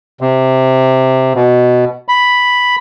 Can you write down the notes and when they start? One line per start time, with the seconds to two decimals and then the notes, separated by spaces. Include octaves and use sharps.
0.21 C3
1.35 B2
2.08 B5